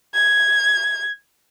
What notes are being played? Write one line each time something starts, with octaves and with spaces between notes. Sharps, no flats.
G#6